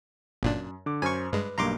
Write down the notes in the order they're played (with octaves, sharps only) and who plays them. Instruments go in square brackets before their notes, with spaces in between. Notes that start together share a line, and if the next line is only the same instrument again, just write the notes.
[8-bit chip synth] G1 A#2 D4 [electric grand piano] F#2
[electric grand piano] D3 D6
[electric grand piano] F#2 C5 F6 [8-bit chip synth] G#5 C#6
[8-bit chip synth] G2 G#3 [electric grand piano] B4
[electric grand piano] B1 G2 A#3 [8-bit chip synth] A#5 C6 D6